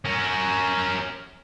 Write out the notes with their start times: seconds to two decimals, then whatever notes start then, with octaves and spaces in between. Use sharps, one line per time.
0.05 C#4 A#4